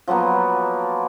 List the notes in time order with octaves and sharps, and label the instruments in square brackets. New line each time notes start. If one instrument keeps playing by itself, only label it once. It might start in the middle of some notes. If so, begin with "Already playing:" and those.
[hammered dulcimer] F3 F#3 A#3 B3